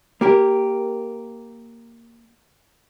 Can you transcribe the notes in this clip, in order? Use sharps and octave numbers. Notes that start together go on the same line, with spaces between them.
A#3 G4 A#4